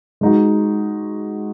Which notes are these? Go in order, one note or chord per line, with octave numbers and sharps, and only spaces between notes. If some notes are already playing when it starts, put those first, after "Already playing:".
G#3 D#4 F#4